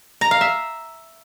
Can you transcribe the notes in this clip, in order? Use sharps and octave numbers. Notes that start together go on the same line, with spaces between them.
A#5
F5
E5